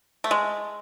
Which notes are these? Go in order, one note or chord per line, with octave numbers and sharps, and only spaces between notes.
A3
G#3